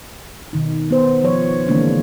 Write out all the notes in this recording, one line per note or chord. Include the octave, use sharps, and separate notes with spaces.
B2 D#3 D#4
B3 C5
F3 C#5
D3 E3 G#3 A#3 C4 D4